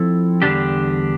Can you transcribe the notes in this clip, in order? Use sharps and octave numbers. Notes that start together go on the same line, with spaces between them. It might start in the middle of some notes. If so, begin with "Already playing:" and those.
Already playing: F3 C4 E4 A4
E2 D3 G3 D4 G4